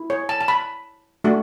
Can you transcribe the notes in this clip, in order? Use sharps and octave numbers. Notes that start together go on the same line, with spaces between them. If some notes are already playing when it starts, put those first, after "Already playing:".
Already playing: E4
C#5
A5
A5
B5
A3 D4 F#4